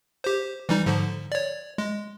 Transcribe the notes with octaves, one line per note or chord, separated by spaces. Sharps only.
G4 C5
E3 G3 D#4
G#2 D3 F3
C#5 D5
G#3